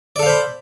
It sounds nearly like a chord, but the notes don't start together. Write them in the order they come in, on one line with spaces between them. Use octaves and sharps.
D5 A4 F5 C5 B5